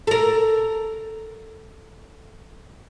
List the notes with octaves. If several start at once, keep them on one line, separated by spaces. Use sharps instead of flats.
A4 A#4